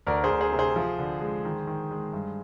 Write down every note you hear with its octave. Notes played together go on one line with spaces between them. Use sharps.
D2 A#4 D5
G#4 C5
D2
G#4 C5
C3
G#4 C5
F3
D3
G#3
D#3
D#3
G#3
G2